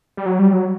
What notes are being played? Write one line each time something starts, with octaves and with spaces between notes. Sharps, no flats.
G3
F#3
G3
F#3